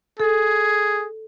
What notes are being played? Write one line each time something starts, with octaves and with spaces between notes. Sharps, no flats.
G#4 A4